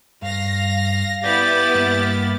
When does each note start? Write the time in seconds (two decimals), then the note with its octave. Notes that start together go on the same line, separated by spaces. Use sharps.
0.22 G2 F5 A#6
1.24 B3 E4 G4 D5 A6
1.75 G2 A#3